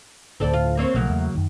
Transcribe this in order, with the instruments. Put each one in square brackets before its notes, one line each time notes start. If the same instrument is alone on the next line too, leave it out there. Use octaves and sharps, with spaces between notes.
[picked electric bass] D2 A2 D3 [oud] C4 A4 D5
[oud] F4
A#3 C4 C#5
[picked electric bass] B1 F3 A3 [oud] C#3 F#3 A#3
[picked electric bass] E2 E3 A3
F#2 D#3